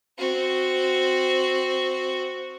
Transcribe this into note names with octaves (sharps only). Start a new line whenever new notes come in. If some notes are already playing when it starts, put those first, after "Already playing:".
C4 F#4